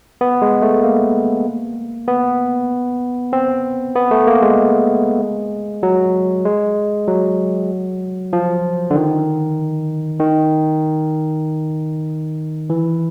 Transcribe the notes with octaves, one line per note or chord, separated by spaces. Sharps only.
B3
G#3
A3
A#3
B3
C4
B3
A3
A#3
G#3
F#3
G#3
F#3
F3
D3
D#3
D#3
E3